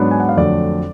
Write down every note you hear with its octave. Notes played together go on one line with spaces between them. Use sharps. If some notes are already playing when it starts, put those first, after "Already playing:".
Already playing: G#2 F#3 B3 D4
G#5
F#5
F5
F2 D3 F#3 A3 D5